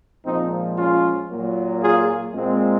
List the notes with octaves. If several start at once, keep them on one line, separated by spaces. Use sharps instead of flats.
A#2 F3 G#3 C4 D#4
C#4 F4
A#2 F#3 A#3
F4 G#4
A#2 G#3 C4